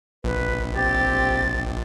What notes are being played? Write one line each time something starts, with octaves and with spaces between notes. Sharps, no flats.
A#1 B4
C4 G4 A6